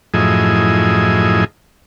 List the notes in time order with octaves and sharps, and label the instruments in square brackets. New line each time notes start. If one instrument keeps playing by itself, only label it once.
[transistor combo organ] F#2 A2 F3 E4 G#4 D#5